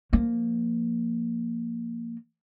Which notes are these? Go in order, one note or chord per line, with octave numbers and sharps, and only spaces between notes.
F3 A#3